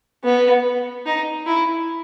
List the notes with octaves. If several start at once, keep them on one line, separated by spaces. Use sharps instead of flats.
B3
D#4
E4